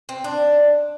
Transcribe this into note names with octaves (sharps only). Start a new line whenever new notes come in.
C4
D4